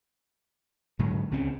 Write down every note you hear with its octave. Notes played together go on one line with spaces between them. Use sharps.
G#2 D3 F#3
C#2 C#3 C4 C#4